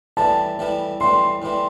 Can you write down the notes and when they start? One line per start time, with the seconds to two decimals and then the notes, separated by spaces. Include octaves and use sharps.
0.17 A2 E3 G3 E4 A5
0.59 A2 E3 G3 E4
1.00 A2 E3 G3 E4 C6
1.42 A2 E3 G3 E4